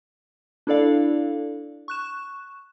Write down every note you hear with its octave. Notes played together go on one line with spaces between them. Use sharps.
D4 E4 A4 D5 F5
C#6 F#6 E7